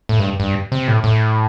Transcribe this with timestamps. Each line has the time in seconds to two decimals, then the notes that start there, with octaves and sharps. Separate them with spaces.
0.09 A2
0.19 G2
0.40 G2
0.72 C3
0.88 A2
1.04 A2